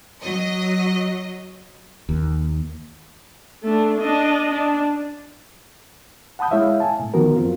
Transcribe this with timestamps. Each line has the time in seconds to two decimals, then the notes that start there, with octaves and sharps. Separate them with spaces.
0.22 F#3 D#5
2.09 D#2
3.63 A3 D4
4.01 D4 D#5
4.51 D4
6.39 F#5 A5 B5 D#6 G6
6.51 G#3 E4 C#5 E5 F5
6.80 G#5 A5
6.99 A2 C3
7.14 D3 D#3 F3 B3 F#4 A#4
7.36 F#2 C4 F4